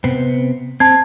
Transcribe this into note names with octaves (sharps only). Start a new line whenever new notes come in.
C3 B3 C4
C4 A5 G#6